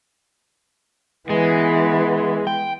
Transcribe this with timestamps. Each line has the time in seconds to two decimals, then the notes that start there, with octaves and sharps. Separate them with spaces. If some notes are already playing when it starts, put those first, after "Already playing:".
1.30 E3 G#3 B3
2.47 G5